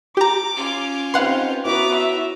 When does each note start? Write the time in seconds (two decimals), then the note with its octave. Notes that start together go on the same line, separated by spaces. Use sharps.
0.17 G4 A#5 D6
0.56 C#4 F4
1.14 C4 D#4 G4 B4 F5 F#5 C6
1.65 B3 E4 F#4 B4 C#5 A#5 D6
1.94 E5